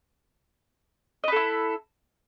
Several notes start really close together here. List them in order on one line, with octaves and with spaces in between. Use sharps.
D#5 B4 A4 E4